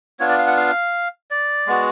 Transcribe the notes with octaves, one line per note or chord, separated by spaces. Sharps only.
B3 D4 F4 C#5
D5
F5
F#5
F5
D5
G#3 B3 F#4